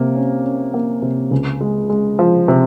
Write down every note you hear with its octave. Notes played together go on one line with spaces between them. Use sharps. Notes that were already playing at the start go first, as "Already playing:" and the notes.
Already playing: C3 A#3
C#4
C#4
A#3
C3
C#2
G#3
G#3
F3
C3